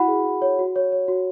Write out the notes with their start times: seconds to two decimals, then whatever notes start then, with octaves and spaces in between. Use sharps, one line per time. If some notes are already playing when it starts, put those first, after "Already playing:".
Already playing: E4 F#4 F#5 B5
0.08 G#4
0.25 E4
0.42 C#5
0.59 F#4
0.76 C#5
0.92 C#5
1.08 F#4